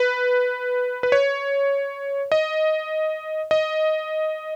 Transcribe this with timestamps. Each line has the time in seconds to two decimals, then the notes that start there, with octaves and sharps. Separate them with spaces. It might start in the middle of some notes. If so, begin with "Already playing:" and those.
Already playing: B4
1.03 B4
1.12 C#5
2.32 D#5
3.51 D#5